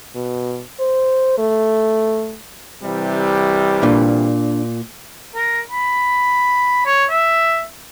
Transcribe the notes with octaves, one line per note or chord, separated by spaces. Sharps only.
B2
C5
A3
C3 E3 G3
A#2 D4
A#4
B5
C#5
E5